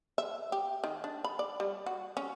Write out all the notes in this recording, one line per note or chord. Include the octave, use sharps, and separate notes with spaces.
E5
G4
D#3
D4
B5
D5
G3
F#4
C#4